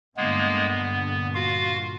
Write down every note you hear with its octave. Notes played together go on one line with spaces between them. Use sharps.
G2 A#2 D3 G#3 A#3 B3
B3
F4 F#4 F5